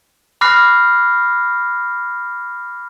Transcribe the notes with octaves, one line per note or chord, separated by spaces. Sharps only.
B5 D6 F6 F#6 A#6 C7